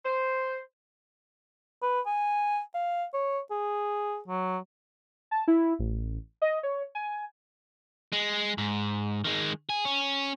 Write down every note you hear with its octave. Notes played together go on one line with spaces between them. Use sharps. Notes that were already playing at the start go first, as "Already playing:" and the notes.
C5
B4
G#5
F5
C#5
G#4
F#3
A5
E4
A1
D#5
C#5
G#5
G#3
G#2
D#3 G#3
G#4
C#4